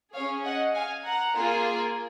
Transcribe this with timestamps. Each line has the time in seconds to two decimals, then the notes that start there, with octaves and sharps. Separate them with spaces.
0.13 C#4 G#4 C#5 F5
0.45 D#5 F#5
0.75 F5 G#5
1.05 F#5 A#5
1.35 A#3 F4 G#4